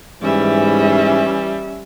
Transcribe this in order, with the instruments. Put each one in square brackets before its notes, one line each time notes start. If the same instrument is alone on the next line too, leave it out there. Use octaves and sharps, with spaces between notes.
[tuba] G#2 [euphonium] E3 [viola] G3 [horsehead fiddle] C#4 E5